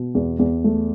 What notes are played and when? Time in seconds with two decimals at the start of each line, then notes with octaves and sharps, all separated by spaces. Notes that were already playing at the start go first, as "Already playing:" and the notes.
Already playing: B2
0.15 E2
0.39 E2
0.64 A3